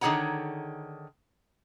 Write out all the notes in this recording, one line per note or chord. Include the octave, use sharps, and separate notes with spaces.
D3 D#3 G#4 C#5 F#5 A#5